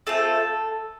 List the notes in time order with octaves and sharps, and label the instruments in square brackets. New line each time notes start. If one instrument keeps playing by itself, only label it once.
[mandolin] A3 C4 F4 A4 A5